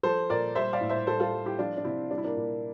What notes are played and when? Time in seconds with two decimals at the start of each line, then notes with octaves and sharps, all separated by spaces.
0.03 F3 A4 C5
0.30 A#2 A#4 D5
0.55 G3 C5 E5
0.73 D5 F5
0.81 A2
0.89 C5 E5
1.07 G3 A4 C5
1.20 F4 A4
1.33 G3
1.46 E4 G4
1.59 F3 D4 F4
1.77 D4
1.84 C3 C4 E4
2.10 G3 D4
2.18 E4
2.24 A#3 D4
2.36 A#2